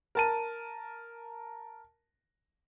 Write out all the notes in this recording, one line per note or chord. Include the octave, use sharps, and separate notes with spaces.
A#4 A5 D#7